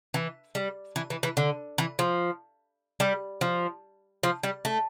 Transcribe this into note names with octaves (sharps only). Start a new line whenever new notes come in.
E3
G3
E3
E3
E3
D3
E3
F3
G3
F3
F3
G3
A3